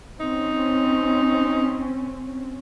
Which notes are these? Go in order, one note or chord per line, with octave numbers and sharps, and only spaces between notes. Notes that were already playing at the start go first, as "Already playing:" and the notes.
C4 C#4 D#4